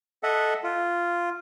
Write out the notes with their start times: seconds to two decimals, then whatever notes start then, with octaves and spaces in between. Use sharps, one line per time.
0.23 A4 D#5 E5 F#5
0.64 F4